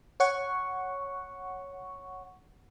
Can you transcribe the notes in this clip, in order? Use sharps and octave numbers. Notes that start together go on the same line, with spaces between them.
C#5 F#5 C#6